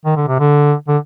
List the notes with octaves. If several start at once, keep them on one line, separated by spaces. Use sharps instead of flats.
D#3
D3
C3
D3
D3